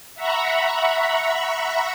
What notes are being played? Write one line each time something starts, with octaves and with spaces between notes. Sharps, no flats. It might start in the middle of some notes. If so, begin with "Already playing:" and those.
E5 F#5 A#5 B5 C#6